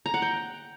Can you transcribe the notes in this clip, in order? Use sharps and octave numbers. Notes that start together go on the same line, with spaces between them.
A#5
F#5
G5